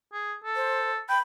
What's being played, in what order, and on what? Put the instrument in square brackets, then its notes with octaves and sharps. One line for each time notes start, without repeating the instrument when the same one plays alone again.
[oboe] G#4
A4
[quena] C5
[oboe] G5 [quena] B5